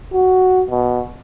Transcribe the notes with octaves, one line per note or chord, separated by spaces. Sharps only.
F#4
B2